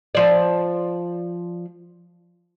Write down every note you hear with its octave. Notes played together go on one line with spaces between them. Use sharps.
F3 D5